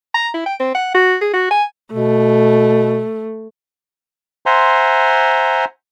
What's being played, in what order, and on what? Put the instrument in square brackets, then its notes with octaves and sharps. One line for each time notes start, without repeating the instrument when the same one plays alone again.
[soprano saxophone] A#5
E4
G5
C4
F#5
F#4
G#4
F#4
G#5
[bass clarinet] B2 [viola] A3
[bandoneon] C5 E5 F#5 G#5 A#5 C6